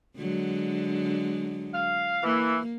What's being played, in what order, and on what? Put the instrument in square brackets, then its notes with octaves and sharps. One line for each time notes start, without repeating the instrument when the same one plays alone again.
[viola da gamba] D3 F#3 G#3
[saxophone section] F5
[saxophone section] E3 [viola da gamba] A#3